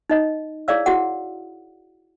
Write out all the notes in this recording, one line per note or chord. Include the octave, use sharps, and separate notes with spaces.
D#4 D#5
E4 G#4 C#5 D5 F5 E6
E4 F#4 G#4 F#5